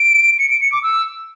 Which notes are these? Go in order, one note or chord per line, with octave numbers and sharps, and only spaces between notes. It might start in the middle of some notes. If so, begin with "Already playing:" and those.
Already playing: D7
C#7
D7
C#7
D6
E6